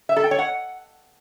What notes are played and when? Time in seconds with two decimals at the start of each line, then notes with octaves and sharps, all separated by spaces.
0.09 E5
0.16 A4
0.24 G5
0.31 C#5
0.39 F#5